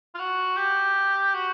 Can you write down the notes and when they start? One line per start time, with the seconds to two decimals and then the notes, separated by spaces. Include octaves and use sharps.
0.15 F4
0.19 F#4
0.57 G4
1.34 F#4